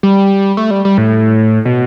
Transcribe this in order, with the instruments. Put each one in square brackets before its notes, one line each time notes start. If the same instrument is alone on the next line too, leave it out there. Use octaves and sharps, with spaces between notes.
[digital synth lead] G3
A3
G3
G3
A2
B2